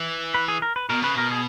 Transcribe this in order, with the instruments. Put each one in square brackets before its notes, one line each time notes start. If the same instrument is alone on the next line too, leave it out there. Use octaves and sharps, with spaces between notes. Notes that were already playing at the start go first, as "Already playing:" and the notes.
Already playing: [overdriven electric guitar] E3
[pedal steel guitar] B4
G#4
A#4
B4
[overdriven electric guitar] B2 [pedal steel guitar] A#4
[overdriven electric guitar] C#3 [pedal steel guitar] B4
[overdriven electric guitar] B2 [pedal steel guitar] A#4
[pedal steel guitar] G#4